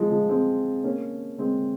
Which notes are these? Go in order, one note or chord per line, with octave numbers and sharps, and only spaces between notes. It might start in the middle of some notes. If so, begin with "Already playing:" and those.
Already playing: F3 G#3
F3 G#3
G#3 C4
A#3 C#4
G#3 C4